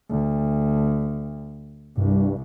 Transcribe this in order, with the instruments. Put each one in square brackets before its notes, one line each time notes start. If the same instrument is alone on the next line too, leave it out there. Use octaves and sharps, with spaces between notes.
[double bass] D2
[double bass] C2 [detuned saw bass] G2